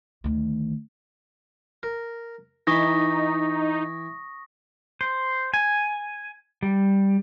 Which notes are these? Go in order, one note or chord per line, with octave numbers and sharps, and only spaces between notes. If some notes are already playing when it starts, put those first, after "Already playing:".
D2 D#3
A#4
E3 D#4 B5 C#6 D#6 A#6
C5
G#5
G3